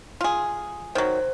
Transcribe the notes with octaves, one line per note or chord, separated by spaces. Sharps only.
F4 G#4
D#3 F#3 C5